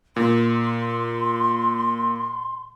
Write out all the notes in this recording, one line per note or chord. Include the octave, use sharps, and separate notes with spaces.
A#2 C6